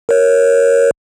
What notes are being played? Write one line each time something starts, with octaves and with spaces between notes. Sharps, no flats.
A#4 C#5